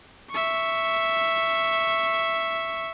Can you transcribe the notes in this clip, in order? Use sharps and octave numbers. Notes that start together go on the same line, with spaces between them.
E5 C#6